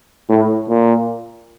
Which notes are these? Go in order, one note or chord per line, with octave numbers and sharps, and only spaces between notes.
A2
A#2